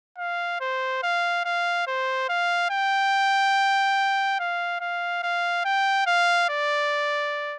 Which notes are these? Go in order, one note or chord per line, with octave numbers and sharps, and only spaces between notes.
F5
C5
F5
F5
C5
F5
G5
F5
F5
F5
G5
F5
D5